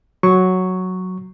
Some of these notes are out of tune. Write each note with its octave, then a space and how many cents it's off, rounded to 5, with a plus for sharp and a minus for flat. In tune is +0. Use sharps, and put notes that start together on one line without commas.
F#3 +0 C#6 +0